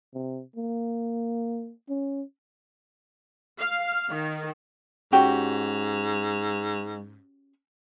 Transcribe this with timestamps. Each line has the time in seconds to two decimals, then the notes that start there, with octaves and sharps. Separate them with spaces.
0.14 C3
0.56 A#3
1.89 C#4
3.58 F5
4.08 D#3
5.12 G#2 C#4 F#4 G4